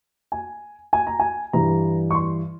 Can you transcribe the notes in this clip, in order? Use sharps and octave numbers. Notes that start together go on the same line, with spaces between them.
G#5
G#5
A#5
G#5
G2 E3 G3 A#5
C#6
C6